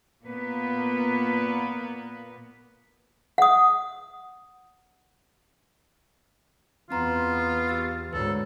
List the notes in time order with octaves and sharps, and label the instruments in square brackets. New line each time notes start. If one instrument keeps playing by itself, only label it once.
[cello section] A#2 A#3 B3 B4
[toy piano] F#5 D#6
[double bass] E2 [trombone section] B3 [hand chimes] C4 A#5 C6 [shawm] F4
[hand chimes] G4 E6 A6
[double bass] D2 G#2 [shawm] A4 [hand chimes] B4 C#5